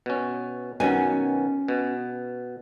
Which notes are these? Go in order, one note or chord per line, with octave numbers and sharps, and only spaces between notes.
B2 C#4
B2 D#3 F#3 C#4 G#5
B2